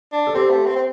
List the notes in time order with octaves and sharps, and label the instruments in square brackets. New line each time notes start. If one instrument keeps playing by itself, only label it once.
[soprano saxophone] D4
[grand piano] A4
[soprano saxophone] C4 [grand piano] G4
[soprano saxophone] A3
C4
C4